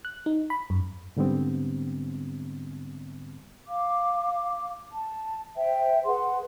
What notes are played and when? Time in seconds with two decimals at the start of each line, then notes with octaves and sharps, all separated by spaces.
0.05 F#6
0.26 D#4
0.50 B5
0.70 F#2
1.17 G#2 D3 G3 B3 C4
3.68 F5 D6
4.92 A5
5.57 C5 E5 G5
6.05 G#4 B4 F#5 C6